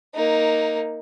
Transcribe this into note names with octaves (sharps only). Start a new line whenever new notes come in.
A#3 D#4